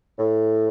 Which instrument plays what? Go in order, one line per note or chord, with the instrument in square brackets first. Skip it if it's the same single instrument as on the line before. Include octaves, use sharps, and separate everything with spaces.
[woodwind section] A2